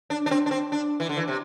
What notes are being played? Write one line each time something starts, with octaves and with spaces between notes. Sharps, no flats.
D4
D4
C4
D4
C4
D4
E3
D3
E3
C3